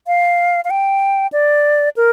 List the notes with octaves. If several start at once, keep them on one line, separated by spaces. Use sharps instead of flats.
F5
F5
G5
D5
A#4